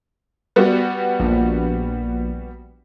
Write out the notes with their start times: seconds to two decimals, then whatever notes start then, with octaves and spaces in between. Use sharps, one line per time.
0.56 G3 B3 F#4
1.20 A#1